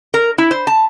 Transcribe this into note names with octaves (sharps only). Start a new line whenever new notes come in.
A#4
E4
C5
A5